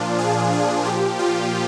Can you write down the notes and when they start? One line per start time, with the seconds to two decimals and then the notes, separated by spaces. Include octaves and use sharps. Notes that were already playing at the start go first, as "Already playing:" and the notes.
Already playing: A#2 F3 D4 F4
0.18 G#4
0.53 G#4
0.85 A#2 F3 G4
1.19 F4